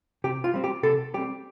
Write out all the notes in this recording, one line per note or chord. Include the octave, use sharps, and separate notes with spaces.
C3 G4
F4
G3 C4
G4
C3 A4
G3 C4 G4